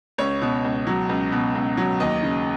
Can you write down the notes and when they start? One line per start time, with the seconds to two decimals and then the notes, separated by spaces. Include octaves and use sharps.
0.18 C#2 C#5
0.42 B2
0.64 C#2
0.87 F#3
1.09 C#2
1.32 B2
1.55 C#2
1.77 F#3
2.00 D#2 D#5
2.23 C#3